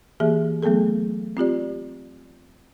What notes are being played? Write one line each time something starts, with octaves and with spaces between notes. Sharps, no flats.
E3 A#3 G4 G#4 E5
F#3 A3 B3 G#4 A4
C4 F4 G4 D5